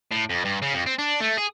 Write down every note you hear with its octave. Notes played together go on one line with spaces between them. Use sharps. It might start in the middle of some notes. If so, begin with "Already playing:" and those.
A2
F2
G2
C#3
F2
C4
D4
A3
G#4